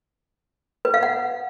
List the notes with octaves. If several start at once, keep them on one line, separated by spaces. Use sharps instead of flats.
B4
F5
F#5